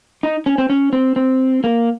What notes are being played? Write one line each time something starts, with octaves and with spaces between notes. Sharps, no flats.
D#4
C#4
C4
C#4
C4
C4
A#3